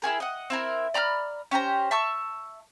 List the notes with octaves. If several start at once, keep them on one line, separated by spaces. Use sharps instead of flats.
E4 F#4 G#4 A#4
D#5 F#5
C4 E4 A#4
D5 A#5 B5 F6
C#4 G4 C5 A#5
E5 A5 C#6 E6